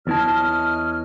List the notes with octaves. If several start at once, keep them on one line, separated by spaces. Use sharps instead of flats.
E2 E4 C#5 D#5 A5 F6